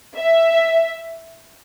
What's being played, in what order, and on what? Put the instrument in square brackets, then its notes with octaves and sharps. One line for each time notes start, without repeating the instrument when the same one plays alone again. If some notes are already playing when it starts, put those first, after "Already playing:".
[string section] E5